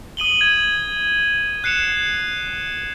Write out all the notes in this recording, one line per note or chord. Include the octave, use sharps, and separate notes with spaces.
D#6 D#7 F#7 G7
G#6 F#7
F#6 C7 C#7 E7 F7